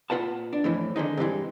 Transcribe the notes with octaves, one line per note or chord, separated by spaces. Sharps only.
A#2 F4 B4 F#5 A5
D4
F2 A2 E3
D3 D#3 G#3 D#4
G2 C3 E3 G#3